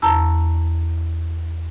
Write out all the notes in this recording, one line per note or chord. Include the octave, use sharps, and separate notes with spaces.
E2 A5 A#5 E6